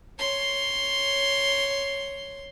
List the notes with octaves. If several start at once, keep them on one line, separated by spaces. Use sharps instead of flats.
C#5 C6